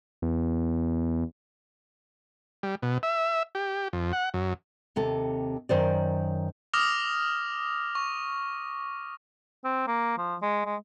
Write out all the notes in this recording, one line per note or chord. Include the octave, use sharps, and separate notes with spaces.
E2
G3
B2
E5
G4
F2
F#5
F#2
D#2 C3 A4
F#2 D#3 C5 D5
D6 D#6 F6 A#6 F7
C#6
C4
A#3
F3
G#3
G#3